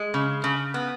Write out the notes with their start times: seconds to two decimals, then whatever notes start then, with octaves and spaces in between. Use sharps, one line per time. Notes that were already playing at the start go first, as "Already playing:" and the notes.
Already playing: G#3
0.14 C#3
0.44 C#3
0.74 B3